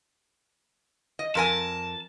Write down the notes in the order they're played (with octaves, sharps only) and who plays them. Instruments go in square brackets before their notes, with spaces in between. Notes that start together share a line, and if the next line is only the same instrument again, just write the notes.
[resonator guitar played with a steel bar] D#5
[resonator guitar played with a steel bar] F2 A#4 G#5 [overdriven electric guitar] A5